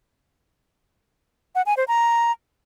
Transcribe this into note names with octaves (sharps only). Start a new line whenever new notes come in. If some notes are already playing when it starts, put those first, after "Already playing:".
F#5
G#5
C5
A#5